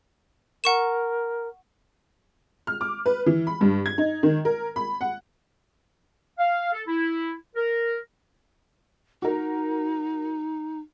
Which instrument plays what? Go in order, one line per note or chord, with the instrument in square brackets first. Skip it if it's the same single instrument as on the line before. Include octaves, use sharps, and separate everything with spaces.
[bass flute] A#4 [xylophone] F#5 C#6 E7
[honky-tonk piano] F6
D6
B4
E3
B5
G2
G#6
D#4
D#3
A#4
B5
F#5
[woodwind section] F5
A4
E4
A#4
[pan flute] D#4 [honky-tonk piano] F#4 A#4